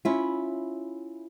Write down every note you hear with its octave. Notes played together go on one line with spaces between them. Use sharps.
C#4 E4 F4